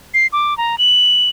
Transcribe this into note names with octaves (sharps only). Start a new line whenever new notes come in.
C7
D6
A#5
F#7